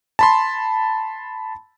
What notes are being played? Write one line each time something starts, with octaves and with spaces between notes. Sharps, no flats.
A5 B5 C6